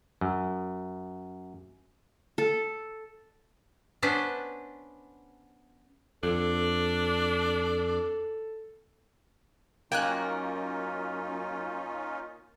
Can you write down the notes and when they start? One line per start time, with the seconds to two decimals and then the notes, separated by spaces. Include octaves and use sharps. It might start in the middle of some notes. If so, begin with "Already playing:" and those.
0.21 F#2
2.38 A4
4.02 B3 C#4 D4 B4 C5
6.23 F2 D4 A4
9.92 F#2 A#3 C#4 D#4 F4 G5 G#5 F#6